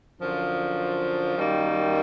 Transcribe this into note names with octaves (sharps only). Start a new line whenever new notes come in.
F#2 D3 F3
F#2 D#3 G3 A#3